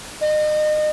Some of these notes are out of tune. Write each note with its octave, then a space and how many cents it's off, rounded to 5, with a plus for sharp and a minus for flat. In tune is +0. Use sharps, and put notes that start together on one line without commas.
D#5 -35